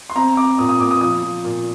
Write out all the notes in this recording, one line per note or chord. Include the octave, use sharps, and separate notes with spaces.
C6
C4 A#5
C4 D6
A#2 D#6
D#6
A#2 D6
D#6
F3 D#6
F3
A#2